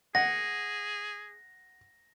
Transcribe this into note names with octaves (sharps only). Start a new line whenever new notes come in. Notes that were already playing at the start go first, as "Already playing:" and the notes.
G#4 F#5 A#6